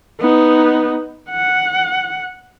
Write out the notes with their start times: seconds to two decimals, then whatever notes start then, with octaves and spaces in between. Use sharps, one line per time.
0.21 B3 D#4
1.30 F#5